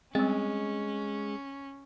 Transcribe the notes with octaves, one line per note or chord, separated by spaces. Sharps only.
G3 G#3 C4 C#4